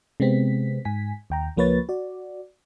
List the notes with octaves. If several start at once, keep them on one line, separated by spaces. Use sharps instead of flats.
C3 G#3 B3 C4 B6
G#2 G#5 B6
D#2 G5 A#5
C#2 F3 A#3 B4 C#5 A6
F#4 D5